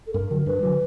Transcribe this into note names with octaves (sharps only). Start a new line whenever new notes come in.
A4
G2 A#4
D3 F#3 A#4
G2 B4
D3 F#3